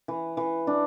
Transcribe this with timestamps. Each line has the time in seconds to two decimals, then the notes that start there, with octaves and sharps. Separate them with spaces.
0.08 E3
0.37 E3
0.67 D4